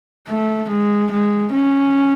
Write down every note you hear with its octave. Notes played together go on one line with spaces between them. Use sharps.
A3
G#3
G#3
C#4